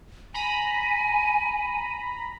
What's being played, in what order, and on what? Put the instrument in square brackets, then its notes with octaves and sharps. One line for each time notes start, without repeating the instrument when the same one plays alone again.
[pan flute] G#5 [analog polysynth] A#5 B5